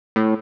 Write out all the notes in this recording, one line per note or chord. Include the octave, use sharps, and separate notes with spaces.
A2